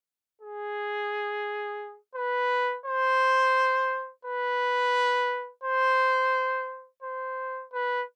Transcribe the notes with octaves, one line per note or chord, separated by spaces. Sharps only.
G#4
B4
C5
B4
C5
C5
B4